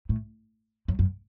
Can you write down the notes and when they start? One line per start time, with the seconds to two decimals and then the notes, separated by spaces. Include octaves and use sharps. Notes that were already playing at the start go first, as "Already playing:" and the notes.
0.09 A2
0.88 F#2
0.99 F#2